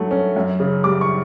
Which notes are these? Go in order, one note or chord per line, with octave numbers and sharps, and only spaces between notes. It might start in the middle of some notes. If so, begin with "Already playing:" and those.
Already playing: G2 F#3 A3
C#4
F#2
C#3
G3 D6
C#6